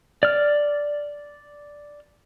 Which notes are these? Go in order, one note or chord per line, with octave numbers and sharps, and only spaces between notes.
D5 F6